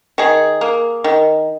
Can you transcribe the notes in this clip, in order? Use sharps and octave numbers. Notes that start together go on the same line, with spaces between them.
D#3 G#4
A#3
D#3